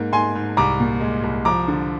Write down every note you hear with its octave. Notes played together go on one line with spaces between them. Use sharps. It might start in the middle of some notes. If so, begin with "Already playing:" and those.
Already playing: G#2 A#3
G#2 G#5 C6
G#2
C2 A#5 D6
A#2
G#3
C2
F3 A#5 D6
D3